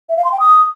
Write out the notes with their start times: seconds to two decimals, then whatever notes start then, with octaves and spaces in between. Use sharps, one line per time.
0.09 E5
0.17 F5
0.24 C6
0.32 G5
0.40 D#6